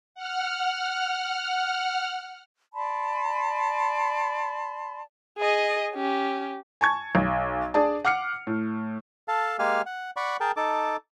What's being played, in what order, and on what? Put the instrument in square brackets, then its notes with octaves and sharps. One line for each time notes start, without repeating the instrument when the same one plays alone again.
[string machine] F#5 F6
[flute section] D5 A5 B5 C6
[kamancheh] G#4 D#5
C#4 G4
[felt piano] G#5 A5 C#6 G#6
B1
D4 G#4 D5 A5
F#5 D6 F6 C7 C#7
A2
[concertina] A4 F5 A5
G#3 A#3 G4 F5 G#5 F6
F#5
D5 F#5 B5 C#6
G#4 A#4 G5 A5
D#4 A4 A5 D6